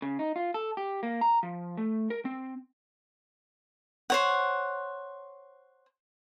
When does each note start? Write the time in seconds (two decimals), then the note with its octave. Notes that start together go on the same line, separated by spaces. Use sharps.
0.02 C#3
0.19 D#4
0.36 F4
0.54 A4
0.77 G4
1.03 A#3
1.21 A#5
1.43 F3
1.77 A3
2.10 A#4
2.25 C4
4.10 C5 C#5 F#5